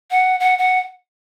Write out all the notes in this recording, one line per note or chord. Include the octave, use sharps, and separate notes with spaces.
F#5
F#5
F#5